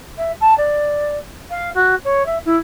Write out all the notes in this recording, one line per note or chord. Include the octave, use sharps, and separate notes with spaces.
E5
A5
D5
F5
F#4
C#5
E5
E4